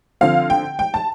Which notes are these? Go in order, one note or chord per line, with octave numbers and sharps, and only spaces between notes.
D3 F3 C4 F5
G5
G5
A5